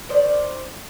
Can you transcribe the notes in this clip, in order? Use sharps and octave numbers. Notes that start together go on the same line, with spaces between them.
D#3 C5 D5